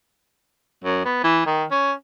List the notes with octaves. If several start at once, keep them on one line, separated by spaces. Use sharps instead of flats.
F#2
B3
E3
D#3
C#4